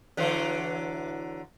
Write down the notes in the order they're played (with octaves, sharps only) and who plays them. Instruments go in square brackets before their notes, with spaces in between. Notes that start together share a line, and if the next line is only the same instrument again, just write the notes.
[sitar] D3 E3 F#3